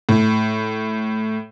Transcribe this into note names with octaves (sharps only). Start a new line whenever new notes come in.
A2